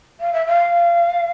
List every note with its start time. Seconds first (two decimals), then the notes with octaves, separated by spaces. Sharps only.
0.19 F5
0.32 E5
0.45 F5